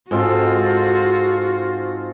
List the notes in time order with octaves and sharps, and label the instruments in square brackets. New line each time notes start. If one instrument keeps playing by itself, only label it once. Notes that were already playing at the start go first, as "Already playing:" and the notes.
[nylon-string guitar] G#2 [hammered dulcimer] G#3 C4 A4 [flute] F4 [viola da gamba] F#4